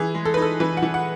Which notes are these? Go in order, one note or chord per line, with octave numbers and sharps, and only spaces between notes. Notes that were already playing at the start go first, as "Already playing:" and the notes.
Already playing: E3 G#4
G#3
A4
B4
D#4 A4
E3 B4
F#5
E3
F#5